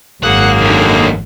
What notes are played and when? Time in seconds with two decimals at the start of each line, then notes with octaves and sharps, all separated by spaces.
0.23 G#1 F#2 A#3 G#4 F#5
0.61 D#2 D3